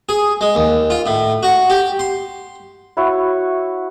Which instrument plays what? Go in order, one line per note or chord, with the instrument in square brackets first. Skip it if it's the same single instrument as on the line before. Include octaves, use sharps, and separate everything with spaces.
[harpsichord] G#4
G#3
D#2
F4
A2
F#4
G4
C6
[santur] E4 F#4 C#5 C#6